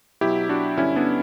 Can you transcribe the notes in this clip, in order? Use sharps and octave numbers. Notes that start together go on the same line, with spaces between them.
B2 F#3 E4 G4
D4 F#4
G2 D3 G3 C#4 E4
B3 D4